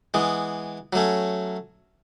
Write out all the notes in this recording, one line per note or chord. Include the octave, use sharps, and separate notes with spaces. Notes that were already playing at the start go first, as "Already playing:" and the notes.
E3 G#3 B3
F#3 A3 C#4